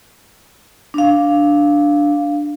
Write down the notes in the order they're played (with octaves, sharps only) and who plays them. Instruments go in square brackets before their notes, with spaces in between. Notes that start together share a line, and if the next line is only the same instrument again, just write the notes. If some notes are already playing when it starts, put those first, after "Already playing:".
[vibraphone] D4 F5